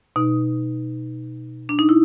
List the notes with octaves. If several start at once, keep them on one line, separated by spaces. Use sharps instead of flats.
B2 D#4
D4
D#4
E4